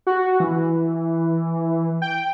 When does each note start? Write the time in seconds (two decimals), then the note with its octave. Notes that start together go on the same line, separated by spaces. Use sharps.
0.07 F#4
0.40 E3
2.02 G5